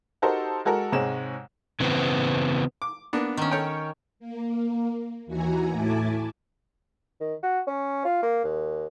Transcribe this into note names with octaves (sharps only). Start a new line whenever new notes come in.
D#4 F#4 G4 A4 A#4 C5
G#3 F#4 A4 A#4
G#2 C3 G#3 C#5 E7
C#3 E3 B3 C4
D6
A#3 B3 D4
D#3 C#4
A4 C#5 G5
A#3
D#2 E3 F#4 G#5 A#5
A2 A3 E4 G#5 A5 D6
D#3
F#4
C#4
F4
A#3
D#2